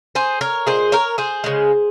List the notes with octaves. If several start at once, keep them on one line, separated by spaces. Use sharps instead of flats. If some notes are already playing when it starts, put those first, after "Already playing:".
G#4 C5
A#4 C#5
A#2 G#3 G#4 C5
A#4 C#5
G#4 C5
C#3 G#3